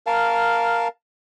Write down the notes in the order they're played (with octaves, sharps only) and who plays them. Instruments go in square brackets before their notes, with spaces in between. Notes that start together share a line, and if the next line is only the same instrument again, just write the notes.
[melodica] A#4 F5 A5